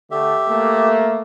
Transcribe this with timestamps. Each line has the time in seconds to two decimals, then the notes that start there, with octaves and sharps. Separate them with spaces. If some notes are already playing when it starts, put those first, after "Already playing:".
0.11 D3 A3 G4 E5
0.49 A3 A#3